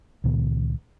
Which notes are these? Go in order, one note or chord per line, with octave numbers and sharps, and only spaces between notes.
C#2 A#2 D#3 B3